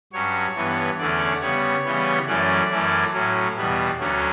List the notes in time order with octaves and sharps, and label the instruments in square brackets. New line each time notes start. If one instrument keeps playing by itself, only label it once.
[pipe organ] G2 F#3 C#4 C#5
G2 E3 B3
E2 D3 A3 C#4 D5
C#3 G3 B3 C#5
C#3 E3 G3 B3
F#2 E3 A3 C#4 D5
F#2 E3 A3 C#4
A2 F#3 C#4
E2 B2 G3 B3
D2 D3 F#3 A3 C#4